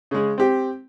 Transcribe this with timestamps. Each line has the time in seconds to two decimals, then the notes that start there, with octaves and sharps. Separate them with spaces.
0.11 C#3 G#3
0.38 C4 G4